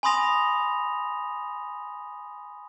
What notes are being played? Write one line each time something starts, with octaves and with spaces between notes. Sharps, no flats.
G#5 B5 C6 D#6 A#6 F7